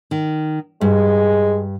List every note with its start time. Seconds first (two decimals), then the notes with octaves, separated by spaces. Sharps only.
0.11 D#3
0.81 G2 G#3